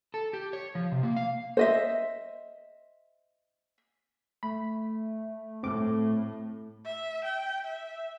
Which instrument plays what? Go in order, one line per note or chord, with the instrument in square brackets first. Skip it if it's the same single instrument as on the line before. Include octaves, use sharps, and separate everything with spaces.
[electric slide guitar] A4
G4
C#5
F3
C3
A#3
F5
[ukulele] C5 D#5 E5
[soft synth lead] A3 [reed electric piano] B5
[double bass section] A2 [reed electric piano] C4 D6
[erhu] E5
G5
E5